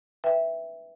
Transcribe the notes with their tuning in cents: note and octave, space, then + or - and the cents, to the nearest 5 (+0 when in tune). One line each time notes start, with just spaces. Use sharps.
B4 +0 E5 +0 G5 +0